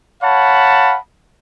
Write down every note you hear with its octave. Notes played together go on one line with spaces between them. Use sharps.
C#5 F5 F#5 A5 B5